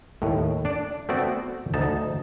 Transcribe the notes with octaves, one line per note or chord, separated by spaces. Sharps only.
D#2 A2
D4 D5
A3 B3 C4 F#4 D5
D2 D#4 A5